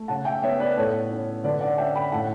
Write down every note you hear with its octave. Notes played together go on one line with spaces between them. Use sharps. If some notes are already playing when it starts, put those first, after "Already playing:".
Already playing: A3
C#3 F#5 A5
E5 G5
B3 C#5 E5
B4 D5
A2 A4 C#5
C#4
D3 B4 D5
D5 F#5
C#4 E5 G5
G5 B5
A2 F#5 A5